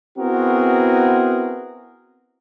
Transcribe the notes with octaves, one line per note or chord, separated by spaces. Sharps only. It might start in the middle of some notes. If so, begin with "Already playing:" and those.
B3 C4 E4 F#4 G#4 A#4